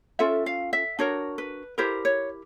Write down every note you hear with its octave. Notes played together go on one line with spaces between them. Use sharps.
C#4 F4 A4 E5
F5
E5
D4 F#4 A#4 C#5
B4
E4 G4 A#4 C5
C#5